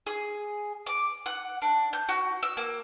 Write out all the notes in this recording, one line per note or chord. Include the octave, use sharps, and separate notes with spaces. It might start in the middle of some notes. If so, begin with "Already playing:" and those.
G#4
D6
F#5
D4
G6
F#4
E6
A#3